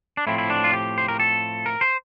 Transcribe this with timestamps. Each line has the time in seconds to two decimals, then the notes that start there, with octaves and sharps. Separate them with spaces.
0.17 D4
0.27 A2 F3 C4 E4
0.38 E4
0.50 D4
0.64 F4
0.73 G4
0.98 C5
1.08 A#4
1.20 A4
1.66 A#4
1.81 C5